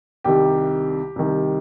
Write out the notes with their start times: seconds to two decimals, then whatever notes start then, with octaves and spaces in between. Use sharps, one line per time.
0.24 C2 C3 D#3 G3 G4
1.16 C2 C3 D#3 G3